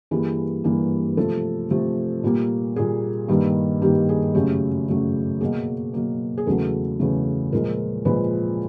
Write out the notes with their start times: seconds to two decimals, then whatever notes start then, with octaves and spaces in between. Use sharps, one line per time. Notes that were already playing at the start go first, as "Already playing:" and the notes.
0.11 G2 E3 G3 A#3 G#4
0.64 G2 E3 G3 A#3
1.17 C3 F3 A3 A4
1.71 C3 F3 A3
2.23 A#2 G3 A#3
2.76 A#2 G3 A#3 G#4
3.28 G2 D#3 G3 A#3
3.82 G2 D#3 G3 A#3 G4
4.09 G#4
4.35 F#2 C#3 F#3 A3 G4
4.88 F#2 C#3 F#3 A3
5.41 B2 F#3 A#3 G#4
5.94 B2 F#3 A#3
6.38 G#4
6.47 E2 C#3 F#3 A3 A4
7.00 E2 C#3 F#3 A3
7.52 A#2 F3 G#3 A#4
8.05 A#2 F3 G#3 B4